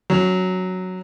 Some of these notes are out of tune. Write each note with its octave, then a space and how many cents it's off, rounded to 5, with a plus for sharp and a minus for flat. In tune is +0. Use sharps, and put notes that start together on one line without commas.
F#3 +0 C#4 +0